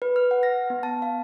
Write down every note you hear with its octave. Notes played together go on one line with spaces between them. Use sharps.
B4
F6
F#5
A#6
B3
A5
F5